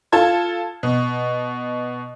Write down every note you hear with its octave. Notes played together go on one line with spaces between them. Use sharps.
F4 A4 A5 G#6
B2